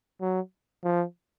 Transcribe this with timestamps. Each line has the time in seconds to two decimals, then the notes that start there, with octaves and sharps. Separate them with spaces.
0.21 F#3
0.84 F3